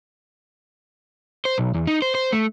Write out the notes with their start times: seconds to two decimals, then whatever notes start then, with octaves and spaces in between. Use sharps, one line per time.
1.45 C5
1.58 B1
1.74 E2
1.87 D#4
2.02 C5
2.15 C5
2.32 A3